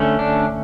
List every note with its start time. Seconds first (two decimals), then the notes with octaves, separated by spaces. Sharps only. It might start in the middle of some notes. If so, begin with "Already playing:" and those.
Already playing: D3 A3 C#4
0.19 D4